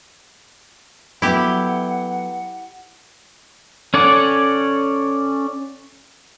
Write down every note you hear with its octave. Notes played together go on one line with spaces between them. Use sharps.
F#3 B3 E4 G4 A4 F#5
C#4 A4 D5 F#5